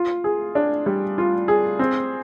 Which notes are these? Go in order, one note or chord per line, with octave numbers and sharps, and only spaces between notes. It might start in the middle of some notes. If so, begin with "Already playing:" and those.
Already playing: F4
G#4
D4
G3
F4
G#4
C4